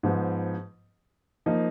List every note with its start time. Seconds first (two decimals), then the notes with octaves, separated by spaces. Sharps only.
0.03 G#2 F3 B3
1.46 F3 A#3 D#4